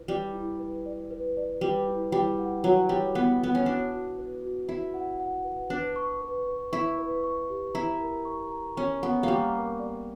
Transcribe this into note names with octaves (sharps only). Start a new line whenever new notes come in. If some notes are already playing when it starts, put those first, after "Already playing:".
Already playing: E4 B4
G3 D5
E4
B4
D5
B4
D5
G3 B4
E4
G3 E4
F#5
F#3 F#5
G3 E4
B3 E4
B3 E4
C#4
D4 F#4
F#4
B4
F#4
E4 F#4
F#5
F#5
B4
D4 B4
C#6
B4
B4
E4 C#6
B4
C#6
G4
E4 A#5
A#4
C#6
A#5
C#4 C#6
B3 C#6
G3 A#3 C#6
A#4
D5